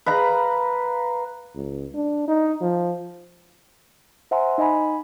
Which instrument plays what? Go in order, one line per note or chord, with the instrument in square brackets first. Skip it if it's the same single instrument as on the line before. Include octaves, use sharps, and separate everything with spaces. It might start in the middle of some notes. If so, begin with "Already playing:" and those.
[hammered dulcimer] B4 F5 A#5 B5
[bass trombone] C#2
D4
D#4
F3
[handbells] C5 E5 F#5 G#5 A#5 C6
D#4 D#5 G#5 B5